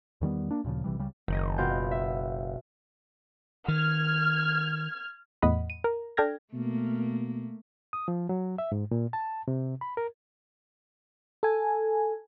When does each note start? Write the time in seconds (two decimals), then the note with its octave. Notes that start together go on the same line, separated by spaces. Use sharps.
0.21 E2 D#3 G3 B3
0.51 A#3 D4
0.64 D2 A#2 C#3 F3
0.84 A#1 C3 E3 G3
0.98 C#2 C#3 G3
1.28 F#1 D#3 D#5
1.58 B2 F4 G6
1.91 E5
3.68 D#3 F6 G#6
5.42 E2 A2 D#5 F#5 B5
5.70 D#7
5.84 A#4
6.17 D4 A4 G5 F6 G#6 A#6
6.54 B2 A3 A#3
7.93 D#6
8.08 F3
8.29 F#3
8.58 E5
8.72 G#2
8.91 A#2
9.13 A5
9.48 C3
9.81 B5
9.97 A#4
11.43 A4 G#5